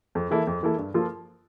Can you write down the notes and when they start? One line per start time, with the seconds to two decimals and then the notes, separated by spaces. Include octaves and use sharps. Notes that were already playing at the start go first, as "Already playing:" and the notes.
0.15 F2
0.31 E3 A#3 E4 A4
0.47 F2
0.63 E3 A#3 E4 A4
0.78 G2
0.94 F3 A#3 F4 A4